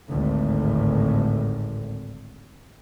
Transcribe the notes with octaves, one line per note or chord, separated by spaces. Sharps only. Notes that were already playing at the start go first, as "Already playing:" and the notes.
G#1 D2 A2